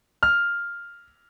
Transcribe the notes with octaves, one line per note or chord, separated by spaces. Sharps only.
F6